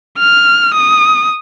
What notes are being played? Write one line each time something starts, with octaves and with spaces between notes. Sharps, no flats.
F6
D#6